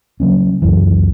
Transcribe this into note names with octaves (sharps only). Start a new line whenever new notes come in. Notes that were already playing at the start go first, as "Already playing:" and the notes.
C#3 F#3 A#3 C#4
C#2 F#2 E3